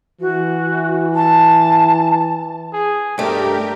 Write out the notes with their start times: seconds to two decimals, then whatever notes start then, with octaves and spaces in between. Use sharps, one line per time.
0.21 E3 F#4
1.15 A5
2.73 G#4
3.18 G2 A3 G4 A#4 D5